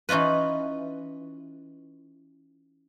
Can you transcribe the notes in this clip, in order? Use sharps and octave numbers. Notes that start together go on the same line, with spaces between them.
E3 C#4 D#4 F4 B4